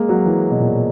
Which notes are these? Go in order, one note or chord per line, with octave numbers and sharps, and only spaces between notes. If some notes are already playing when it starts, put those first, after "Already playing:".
Already playing: G#3 A#3
F#3
E3
B2
A#2